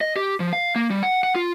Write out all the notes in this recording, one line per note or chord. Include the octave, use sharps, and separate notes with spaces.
D#5
G4
F3
F5
A#3
G3
F#5
F#5
F4